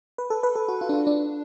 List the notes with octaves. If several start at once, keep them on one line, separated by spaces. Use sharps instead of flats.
B4
A4
B4
A4
F#4
F4
D4
F4
D4